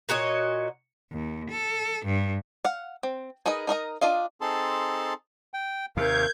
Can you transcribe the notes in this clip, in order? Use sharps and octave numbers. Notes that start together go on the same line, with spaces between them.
A#2 F#4 C#5 D#5
D#2
A4
G2
F5 F#5
C4
D#4 G#4 A#4 B4 D#5
D#4 A#4 D#5 A#5
D4 F4 D#5 F5
C4 D#4 G#4 A4 A5 C6
G5
D#2 C3 A#4 F5 G6 G#6